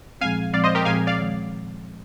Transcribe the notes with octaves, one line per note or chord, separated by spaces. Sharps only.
A#2 F3 G#3 C4 F5 G#5
A#2 F3 G#3 C4 D5 F5
C5 D#5
G4 A#4
A#2 F3 G#3 C4 F5 G#5
D5 F5
D#3 G#3